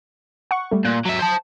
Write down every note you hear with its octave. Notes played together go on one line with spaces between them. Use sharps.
F#5 C#6
G3 A3
A#2 F#6
F#3 E5
C5 A5